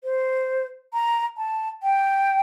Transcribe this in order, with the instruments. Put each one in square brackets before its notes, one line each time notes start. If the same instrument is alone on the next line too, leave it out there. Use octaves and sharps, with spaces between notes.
[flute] C5
A#5
A5
G5